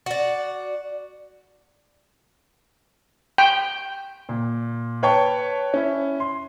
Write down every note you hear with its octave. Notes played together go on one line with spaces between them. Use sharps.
F#4 D5
G5
A#2
B4 C#5 G5 A5 C#6
C#4 E4
C6